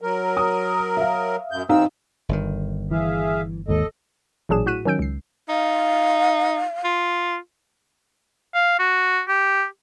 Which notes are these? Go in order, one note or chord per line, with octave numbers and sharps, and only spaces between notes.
F#3 A#4
D#6
E5 F5
F#2 G6
E2 C4 D#4 F5 E6
G1 D#3
E3 G#4 E5 F5
D#2 G#2 A4 D#5
A1 A#2 F#3 D4 G#4 E7
A2 F#4 F#6 B6 D#7 E7
D#3 F#3 C#4 E6 G6 D7
C#2 C7
D#4 F5
F4
F5
F#4
G4